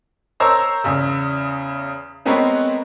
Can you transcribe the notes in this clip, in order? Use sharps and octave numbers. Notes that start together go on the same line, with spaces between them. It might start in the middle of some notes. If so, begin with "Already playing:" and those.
A#4 C5 C#5 A#5 E6
E2 C#3
G#3 B3 C4 A#4 B4 C#5